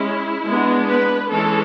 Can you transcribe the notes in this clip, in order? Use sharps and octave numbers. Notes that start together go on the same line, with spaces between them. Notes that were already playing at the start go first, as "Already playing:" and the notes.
Already playing: G#3 C#4 E4
G#3 B3 D4
B4
E3 G#3 C#4 A4